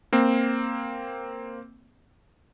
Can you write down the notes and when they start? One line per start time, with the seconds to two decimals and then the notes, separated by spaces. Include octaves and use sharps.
0.13 A#3 C4